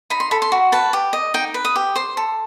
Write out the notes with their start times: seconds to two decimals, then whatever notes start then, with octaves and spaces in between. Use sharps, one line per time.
0.10 D#4 B5
0.20 C6
0.31 A4 B5
0.42 C6
0.52 F#4
0.72 B4 A5
0.93 G4
1.13 D#5
1.34 D#4 G5
1.54 B4
1.65 D#6
1.76 G4
1.96 C5 C6
2.17 A4